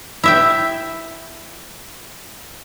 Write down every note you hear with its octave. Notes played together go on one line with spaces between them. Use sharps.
E4 E5 G5